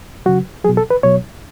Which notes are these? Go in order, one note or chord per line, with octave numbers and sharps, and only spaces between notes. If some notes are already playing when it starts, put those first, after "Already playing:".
C#3 F#3 F#4
B2 F#3 G#4
A4
B4
B2 F#3 C#5